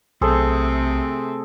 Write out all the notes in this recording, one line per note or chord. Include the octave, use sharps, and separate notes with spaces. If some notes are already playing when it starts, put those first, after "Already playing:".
B1 C3 A3 C4 G#4 A4 C5